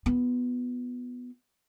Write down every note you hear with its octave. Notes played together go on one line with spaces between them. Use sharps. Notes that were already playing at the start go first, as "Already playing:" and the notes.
B3 F4